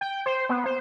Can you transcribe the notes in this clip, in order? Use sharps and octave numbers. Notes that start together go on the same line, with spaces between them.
G5
C5
B3
C5